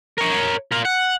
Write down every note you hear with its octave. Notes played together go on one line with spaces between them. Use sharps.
A#4 C#5
F4 A#4
F#5